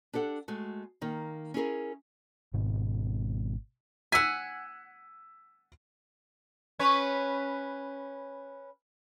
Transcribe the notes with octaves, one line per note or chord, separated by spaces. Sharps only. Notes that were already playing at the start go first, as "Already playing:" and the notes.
D4 G4 A4 F#5
G#3 A3 F#4
D#3 A#3 D#4
C#4 E4 G#4 A#4
G#1 G#2 B2
F#5 G#5 E6 B6
C#4 B4 C#5